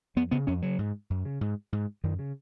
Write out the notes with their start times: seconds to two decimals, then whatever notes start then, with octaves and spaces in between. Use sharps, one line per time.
0.16 F2 B3
0.31 C#3 B3
0.47 F2 C#4
0.62 C#3 F#3
0.78 G#2
1.10 F#2
1.25 C#3
1.41 G#2
1.72 G#2
2.03 F#2 D#3
2.19 C#3